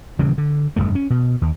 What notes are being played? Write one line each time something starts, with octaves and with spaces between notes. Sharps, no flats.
D#1 C#3 E3 G3
D3
F1 E2 G2 A3
C#4
B2
D#2